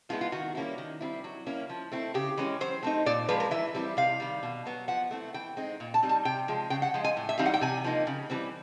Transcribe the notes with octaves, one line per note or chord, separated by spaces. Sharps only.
F3 G#3 B3 E4 F4
F4
D#3 F#4
G3 A#3 C#4 E4
D#3
G3 C4 E4
F#3
A#3 C#4 E4
F3
A3 C4 E4
C#3 G4
E3 G#3 C#4
F#3 C5
A3 C4 D#4
A#2 D5
F3 G#3 B4
A#4
E3 E5
G3 C4 E4
C3 F5
D#3 G3
B2
F#3 B3
F3 F#5
A3 C4 E4
E3 G5
G#3 C4 D#4
A#2
A5
G3 C4 D#4
A5
C3 G5
F3 G#3
C#3 G5
F#5
F3 G#3
G#5
A2
E5
E3 G3 C4 D#4 F5
F#5
G5
C3 G#5
F3 A#3 D#4
C#3
E3 G3 C4